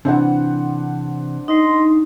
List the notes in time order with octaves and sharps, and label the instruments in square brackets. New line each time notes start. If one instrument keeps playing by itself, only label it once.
[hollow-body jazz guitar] C3 E3 [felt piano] D4 C5 F#5
[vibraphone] D#4 [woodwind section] D#5 C6